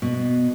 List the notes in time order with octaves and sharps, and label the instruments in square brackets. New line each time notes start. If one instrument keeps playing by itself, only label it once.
[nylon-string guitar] B2